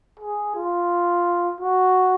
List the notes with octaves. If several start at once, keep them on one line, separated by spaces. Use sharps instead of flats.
G#4
F4
F#4